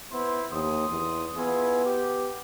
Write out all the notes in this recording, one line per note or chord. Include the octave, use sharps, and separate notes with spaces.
B3 E4 C5
D#2 C6 D#6
E2
B3 E4 F4 G#4
G4